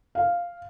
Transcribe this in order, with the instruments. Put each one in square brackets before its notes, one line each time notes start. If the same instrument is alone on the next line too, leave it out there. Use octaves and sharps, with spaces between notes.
[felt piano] F5